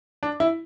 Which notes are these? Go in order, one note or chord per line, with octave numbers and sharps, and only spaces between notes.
D4
E4